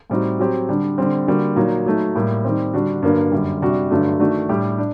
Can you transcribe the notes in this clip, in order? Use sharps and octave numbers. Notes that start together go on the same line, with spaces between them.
A2 G3 C4 D#4 F#4
F#3 C4 G4
D3 G3 D4
D3 G3 C4
D3 G3 A#3 F#4
A#2 F#3 A#3 D#4
F#3 A3 D#4
A2 G3 A#3
D#3 G3 C4
D3 G3 D4 F#4
G2 D3 F#3 A#3
F#2 D3 G3
C3 G3 D4 F#4
G2 D3 F#3 A3
D#3 A3 D4 F#4
A2 G3 D4 G4
D4